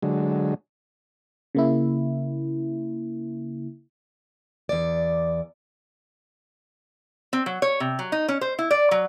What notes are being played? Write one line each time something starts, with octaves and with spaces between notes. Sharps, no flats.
D3 F#3 G#3
C#3 A#3 E4
E2 D5
C4
F#3
C#5
C3
F#3
D#4
C#4
C5
E4
D5
F#3